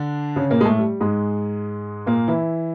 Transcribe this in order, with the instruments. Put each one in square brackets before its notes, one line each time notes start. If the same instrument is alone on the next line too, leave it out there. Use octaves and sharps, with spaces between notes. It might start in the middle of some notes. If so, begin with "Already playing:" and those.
Already playing: [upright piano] D3 D4
C#3 C#4
A#2 A#3
G#3
A2 A3
G3
G#2 G#3
A#2 A#3
E3 E4